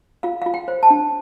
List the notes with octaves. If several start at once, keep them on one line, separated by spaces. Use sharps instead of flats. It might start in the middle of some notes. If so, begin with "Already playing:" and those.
F4 F5
F4 F5
G5
C5
A5
D4